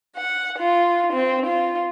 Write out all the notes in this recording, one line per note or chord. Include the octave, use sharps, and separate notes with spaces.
F#5
F4
C4
F4